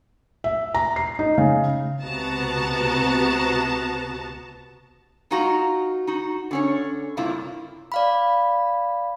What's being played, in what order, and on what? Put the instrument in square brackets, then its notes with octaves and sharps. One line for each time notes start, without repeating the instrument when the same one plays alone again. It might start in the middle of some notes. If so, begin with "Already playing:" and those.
[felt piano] E5
A#5
C7
D#4
C#3
[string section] C#2 C3 B3 F#4 A5 A#5
[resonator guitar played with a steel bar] G#3 D#4 F4 F#4 A#5
D#4 F#4
D3 C#4 C#5
G2 C3 A#3 E4 F4
[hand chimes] D5 F5 B5